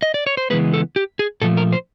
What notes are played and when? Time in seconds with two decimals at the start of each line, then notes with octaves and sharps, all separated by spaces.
0.02 D#5
0.14 D5
0.27 C#5
0.37 C5
0.50 C#3 E3 G#3 B3 B4
0.74 A4
0.96 G4
1.19 G#4
1.42 A#2 F3 A3 A4
1.57 A#4
1.73 C5